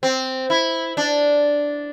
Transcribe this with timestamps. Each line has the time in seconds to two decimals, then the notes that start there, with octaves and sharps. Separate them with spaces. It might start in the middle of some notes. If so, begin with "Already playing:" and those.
0.03 C4
0.50 E4
0.97 D4